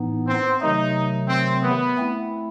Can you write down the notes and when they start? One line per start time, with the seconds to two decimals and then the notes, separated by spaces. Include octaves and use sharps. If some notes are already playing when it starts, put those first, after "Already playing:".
Already playing: A2 E3 B3 D#4
0.27 C4
0.61 C3 D#3 F#3 A3 D#4
1.29 C4
1.63 B3
1.97 A3 C4 E4